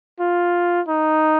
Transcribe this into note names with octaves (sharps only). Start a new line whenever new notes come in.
F4
D#4